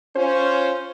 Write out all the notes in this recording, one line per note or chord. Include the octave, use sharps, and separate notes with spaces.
C#4 F4 C5